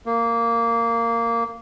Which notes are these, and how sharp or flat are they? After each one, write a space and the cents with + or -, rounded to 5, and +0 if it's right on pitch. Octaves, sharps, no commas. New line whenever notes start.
A#3 -10